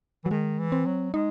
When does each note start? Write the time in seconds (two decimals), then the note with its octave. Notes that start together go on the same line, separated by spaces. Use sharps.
0.24 E3 F#3
0.31 D#3 G#3
0.59 E3
0.72 C4
0.86 F#3
1.14 G#3 D#4